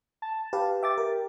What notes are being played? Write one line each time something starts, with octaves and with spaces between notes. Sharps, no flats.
A5
G4 B4 F5
G4 E5 D6 A6
A#4